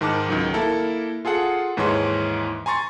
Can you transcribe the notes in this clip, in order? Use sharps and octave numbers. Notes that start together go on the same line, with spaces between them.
G#2 D#3 D#4 A5 D6 F#6
C#2 D#3 F#3
A#3 E4 A4 A#4
F4 G#4 A4 F#5
D#2 G#2 E3 G#3 C#5 C6
G#5 A#5 C6 C#6 A6